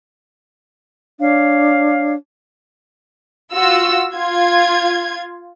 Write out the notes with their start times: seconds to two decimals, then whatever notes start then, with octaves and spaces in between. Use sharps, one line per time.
1.19 D4 C#5 F5
3.53 F4 F#4 E6
4.14 F4 G#6